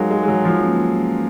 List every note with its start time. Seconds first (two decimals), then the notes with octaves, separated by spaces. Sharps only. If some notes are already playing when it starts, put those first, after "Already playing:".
Already playing: F#3 G#3 D#4 A#4 F5
0.11 G#3
0.23 G#3
0.28 F#3
0.45 F3
0.61 F#3 A#3 C#4 F4 B4